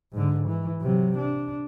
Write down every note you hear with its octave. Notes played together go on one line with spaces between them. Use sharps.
G#2 D3
E3
C3 F#3
D4